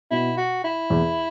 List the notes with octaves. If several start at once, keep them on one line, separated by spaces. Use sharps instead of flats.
B2 E4
F#4
E4
E2